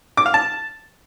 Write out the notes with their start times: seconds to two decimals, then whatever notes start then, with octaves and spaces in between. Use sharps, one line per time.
0.17 D6
0.26 F5
0.34 A5